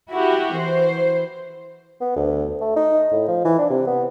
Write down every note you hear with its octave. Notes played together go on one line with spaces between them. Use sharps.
E4 F#4 G4
E3 C5
B3
D2
A3
D#4
A2
F3
E3
D4
C3
B3